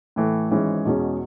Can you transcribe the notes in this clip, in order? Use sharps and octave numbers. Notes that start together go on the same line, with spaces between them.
A2 E3 A3
G#1 G#2 E3 G#3 C#4
E2 B2 G#3 C#4